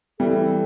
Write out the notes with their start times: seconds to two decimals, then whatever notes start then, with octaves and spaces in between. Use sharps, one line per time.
0.19 E3 G3 A4